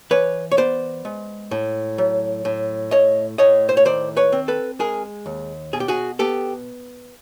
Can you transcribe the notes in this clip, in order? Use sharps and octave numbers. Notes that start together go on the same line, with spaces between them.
E3 B4 C#5
C#5
B3 C5 D5
G#3
A2
F#3
A2
A3 C#5 D#5
A2 C#5 D#5
C5
C#5
D#3 C5 D5
B4 C#5
C4
A4 B4
G#3 G#4 A#4
D#2
B2 G#4
G4
F#4 G#4
B3 G4 A4